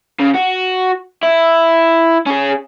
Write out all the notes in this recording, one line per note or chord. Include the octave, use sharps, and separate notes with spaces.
C#3
F#4
E4
C#4 G#4